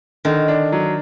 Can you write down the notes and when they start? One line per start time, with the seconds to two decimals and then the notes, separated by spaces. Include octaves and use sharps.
0.25 D3 D#3
0.48 D4
0.72 F#3